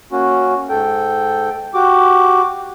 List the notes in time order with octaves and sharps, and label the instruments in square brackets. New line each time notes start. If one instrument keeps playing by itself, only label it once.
[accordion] A#3 C#4 F#4
G#2 A4 G5
F#4 G4 D6